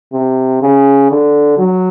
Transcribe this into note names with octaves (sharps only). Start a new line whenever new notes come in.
C3
C#3
D3
F#3